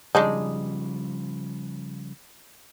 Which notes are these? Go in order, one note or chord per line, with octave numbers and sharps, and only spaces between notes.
C#3 F3 G3 G#3 D4 D#4